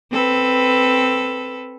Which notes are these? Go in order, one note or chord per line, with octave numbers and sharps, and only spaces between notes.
C4 A4 B4